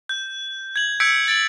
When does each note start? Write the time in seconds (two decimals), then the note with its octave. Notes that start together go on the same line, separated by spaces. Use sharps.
0.09 G6
0.76 G#6 F#7
1.00 E6 G6 G#6 B6 C#7 D7
1.28 A6 D7 F#7